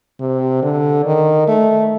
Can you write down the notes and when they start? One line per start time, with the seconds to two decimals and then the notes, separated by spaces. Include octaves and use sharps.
0.21 C3
0.63 D3
1.05 D#3
1.48 A3